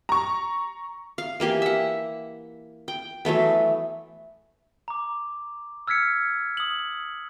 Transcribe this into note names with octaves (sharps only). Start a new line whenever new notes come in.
A#5 C#6
F5
E3 A#3 G4 G#5
E5 F#5
G5
E3 F#3 A3 B3
A#5 D6
E6 F6 G#6 B6 C#7
D#6 F#7